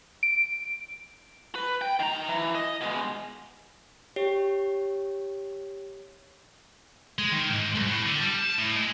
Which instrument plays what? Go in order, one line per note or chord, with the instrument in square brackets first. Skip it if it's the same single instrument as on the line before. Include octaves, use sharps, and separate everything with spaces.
[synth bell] D7
[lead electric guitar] B4
G5
D#3 A#5
E3
D#5
B2 G#3
[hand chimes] G4 C#5
[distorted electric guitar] G#3
D#3
G#2
C2
A2
D3
G3
A5
A2
G#3